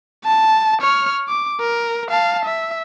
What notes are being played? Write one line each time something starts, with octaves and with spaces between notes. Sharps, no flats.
A5
C#5 F6
D6
A#4
F5 A5
E5